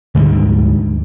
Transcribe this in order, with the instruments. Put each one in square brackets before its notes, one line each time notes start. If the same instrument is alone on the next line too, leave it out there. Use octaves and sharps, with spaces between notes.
[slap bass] D2 G#2 D3 G3